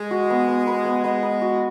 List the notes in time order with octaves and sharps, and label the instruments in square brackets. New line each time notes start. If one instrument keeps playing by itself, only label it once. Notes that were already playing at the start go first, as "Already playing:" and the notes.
Already playing: [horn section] G#3
[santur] F#4
B3
B3
B4
B3
[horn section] G#3 [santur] B3
[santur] B4
F#4